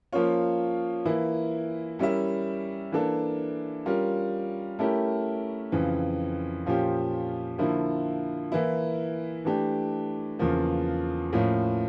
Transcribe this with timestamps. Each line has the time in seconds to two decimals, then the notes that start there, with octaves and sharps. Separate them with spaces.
0.12 F3 A#3 C#4 F4 C#5
1.05 E3 A#3 E4
1.99 G3 C#4 E4 A#4 E5
2.92 E3 A#3 D4 A4
3.86 G3 C#4 F4 A#4
4.79 A3 C#4 E4 G4 A#4
5.72 F2 C#3 E3
6.66 A#2 F3 C#4 G4
7.58 D3 F3 A#3 E4
8.52 E3 A#3 E4
9.45 E3 A3 D4 G4
10.39 E2 C#3 F3 A#3
11.33 A2 F3 A#3 C#4 F4